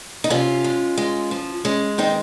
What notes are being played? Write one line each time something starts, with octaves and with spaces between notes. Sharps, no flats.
D#4
C3 C#4 F4
G#3
G#3
F3
G#3 C#4
D#3 C4 D#4